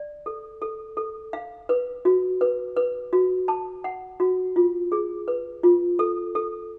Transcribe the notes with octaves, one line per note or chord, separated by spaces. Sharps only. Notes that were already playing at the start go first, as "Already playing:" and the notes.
Already playing: D5
A4
A4
A4
F5
B4
F#4
B4
B4
F#4
A5
F#5
F#4
F4
G#4
B4
F4
A4
A4